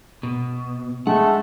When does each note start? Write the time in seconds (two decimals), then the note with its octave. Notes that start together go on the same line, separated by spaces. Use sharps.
0.23 B2
1.07 G#3 A3 F#5